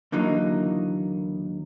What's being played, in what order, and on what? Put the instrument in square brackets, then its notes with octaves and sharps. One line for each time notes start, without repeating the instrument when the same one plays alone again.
[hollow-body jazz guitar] D#2 D3 E3 F#3 A#3 D#4